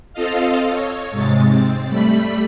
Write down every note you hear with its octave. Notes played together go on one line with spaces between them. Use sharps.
C4 F4 A4 D#5 F5
C#5
G#2 C3 G#3 A6
C4
G3 A3 B5